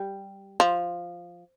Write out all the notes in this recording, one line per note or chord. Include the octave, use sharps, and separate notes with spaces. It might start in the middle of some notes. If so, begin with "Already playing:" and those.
Already playing: G3
F3